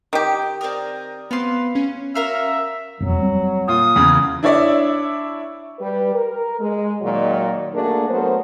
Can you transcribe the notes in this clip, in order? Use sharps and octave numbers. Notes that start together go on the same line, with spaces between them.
D#3 G4
C4 A#4 D5 D#6
B3 C4 B4 F5 C6
C#4
F#4 A#4 E5 F5
E1 F2 F#3
G3 C4
A#2 F4 D#6
E2 C#3 G#4
D4 E4 C#5 D5 E5
G3 B4
A#4
G#3
A#2 D#3 F#3
A3 A#3 D4 F#4 G#4 A#4
F#3 A3 B3 A#4 C5